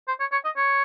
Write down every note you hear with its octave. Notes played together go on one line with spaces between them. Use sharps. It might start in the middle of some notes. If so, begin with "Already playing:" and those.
C5
C#5
C#5
D#5
C#5